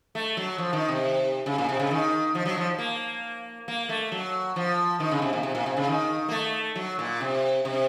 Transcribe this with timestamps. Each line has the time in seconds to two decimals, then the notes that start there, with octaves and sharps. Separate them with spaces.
0.15 A3
0.37 F#3
0.58 F3
0.73 D#3
0.88 C3
1.46 C#3
1.58 A#2
1.69 C3
1.80 C#3
1.91 D#3
2.35 F3
2.45 F#3
2.57 F3
2.78 A#3
3.68 A#3
3.89 A3
4.12 F#3
4.56 F3
5.00 D#3
5.11 C#3
5.22 C3
5.33 A#2
5.43 C3
5.55 A#2
5.66 C3
5.77 C#3
5.87 D#3
6.28 A#3
6.31 A3
6.76 F#3
6.99 A#2
7.20 C3
7.65 C3